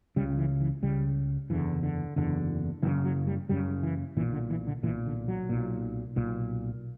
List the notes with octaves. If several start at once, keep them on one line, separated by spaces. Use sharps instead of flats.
C#2 C#3 G3
E3
E3
C#2 C#3 G3
F#1 E2 D3 E3
D3
F#1 E2 D3
F#1 F#2 C#3 E3
F#3
G3
F#1 F#2 C#3 G3
E3
B1 A#2 E3
D3
E3
D3
B1 A#2 E3
D3
F#3
B1 A#2
B1 A#2